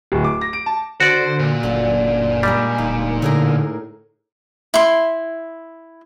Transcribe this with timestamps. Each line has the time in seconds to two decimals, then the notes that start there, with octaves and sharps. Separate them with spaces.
0.12 D1
0.24 D6
0.41 A#6
0.53 D7
0.66 A5
1.00 D3 F#4 C5 D5
1.39 A#2
1.63 F#1 D3 F4
2.43 G3 G#3 G#4 A#4
2.78 D1 D#4
3.22 A2 D3 G#4 A#4
4.74 E4 C6